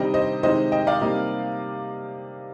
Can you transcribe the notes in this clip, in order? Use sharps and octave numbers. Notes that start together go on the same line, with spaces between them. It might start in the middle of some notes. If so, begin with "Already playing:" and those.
Already playing: C3 D#3 G3 D4 D#5 G5
C5 D#5
C3 D#3 G#3 D#4 C5 D#5
D#5 G5
D5 F5
C3 G3 A#3 D#4